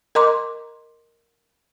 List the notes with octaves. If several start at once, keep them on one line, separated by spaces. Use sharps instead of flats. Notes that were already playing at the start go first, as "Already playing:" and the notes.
A#4 D#5 A#5 C6 D6